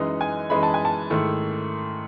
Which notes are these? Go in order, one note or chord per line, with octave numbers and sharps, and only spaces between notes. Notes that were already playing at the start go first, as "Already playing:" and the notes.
Already playing: F#2 E3 G#3 D#4
G#5
F#2 E3 G#3 D#4 B5
A5
G#5
A5
G#2 D#3 A3 E4